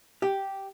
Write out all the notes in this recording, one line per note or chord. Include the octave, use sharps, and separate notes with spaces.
G4